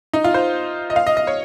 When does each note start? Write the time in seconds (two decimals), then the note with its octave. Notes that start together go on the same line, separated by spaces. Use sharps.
0.13 D#4
0.24 F4
0.34 C5
0.90 D#5
0.96 F5
1.07 D#5
1.17 D#5
1.27 C#5